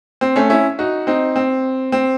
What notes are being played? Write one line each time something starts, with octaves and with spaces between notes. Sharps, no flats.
C4
A3 C#4
C#4 E4
D#4 F#4
C4 D#4
C4
C4